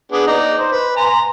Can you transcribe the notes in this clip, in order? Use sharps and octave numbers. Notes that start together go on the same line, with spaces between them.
B3 D4 G#4
D#4 D5 A#5
C5
B4
G#5 A#5 C6